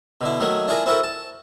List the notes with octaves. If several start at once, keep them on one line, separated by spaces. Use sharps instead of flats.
B2 D3 E4
D#3 F#3 A3 A#3
D4 E4 F4 G#4 A#4 A#5
C4 E4 F#4 A4 A#4
A5